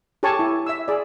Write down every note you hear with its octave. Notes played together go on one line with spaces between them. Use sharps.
G4 A4 C#5 G#5 A5 C#6
E4
E5 E6
G#4 D5